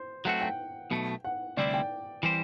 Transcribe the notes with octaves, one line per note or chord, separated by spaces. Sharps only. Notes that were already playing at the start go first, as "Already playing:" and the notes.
Already playing: C5
F#3 A3 C4 F#4 F#5
G5
B1 B2 A3
F#5
D2 C3 G3 C4 E4 D5
G5
E3 G3 C4 G4 C5